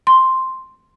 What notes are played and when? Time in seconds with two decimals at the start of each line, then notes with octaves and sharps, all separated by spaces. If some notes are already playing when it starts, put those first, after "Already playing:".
0.07 C6